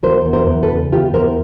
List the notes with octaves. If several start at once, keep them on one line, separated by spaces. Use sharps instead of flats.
E2 A#4 C5
E2
A#4 C5
E2
A4 B4
C#3
E2 F4 G4
E2 A#4 C5